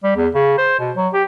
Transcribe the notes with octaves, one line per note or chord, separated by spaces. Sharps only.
G3
E2
C#3
C5
B2
F#3
G4